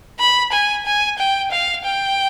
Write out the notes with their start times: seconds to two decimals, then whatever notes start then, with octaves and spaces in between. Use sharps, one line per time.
0.20 B5
0.53 G#5
0.86 G#5
1.19 G5
1.51 F5
1.84 G5